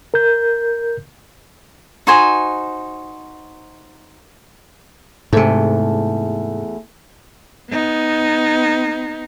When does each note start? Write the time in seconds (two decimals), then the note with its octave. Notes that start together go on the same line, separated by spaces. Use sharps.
0.14 A#4 G6
2.07 D#4 F#4 C5 G#5
5.33 E2 G#2 C3 A3
7.70 B3 D#4